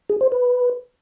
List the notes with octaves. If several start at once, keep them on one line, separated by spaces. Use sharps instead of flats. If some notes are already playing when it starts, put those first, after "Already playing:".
G#4
C5
B4